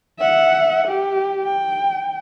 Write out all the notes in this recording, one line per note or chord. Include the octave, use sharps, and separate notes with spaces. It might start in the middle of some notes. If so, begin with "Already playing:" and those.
E5 F#5
G4
G5